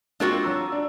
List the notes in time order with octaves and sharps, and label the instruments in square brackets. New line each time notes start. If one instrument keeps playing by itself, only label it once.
[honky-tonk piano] G#3 A#3 C4 [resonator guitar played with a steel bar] D4 F4 F#4
[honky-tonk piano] F#3 A#5 E6
D4